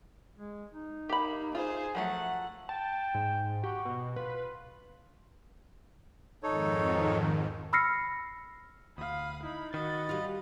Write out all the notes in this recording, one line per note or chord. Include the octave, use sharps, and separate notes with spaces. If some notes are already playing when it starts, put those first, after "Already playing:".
G#3
D#4
A#3 G4 B5
F4 G#4 C5
F3 F#3 A3 F#5
G5 A5
G#2
F#4 G4
B2
F4 B4
F2 G#2 D#3 D#4 A4 C#5
B5 E6 F6 A#6 C7 C#7
D2 F5 B5 D#6
D#4 E4 B5
D#3 F#4 D#5 B5 A6
G3 F4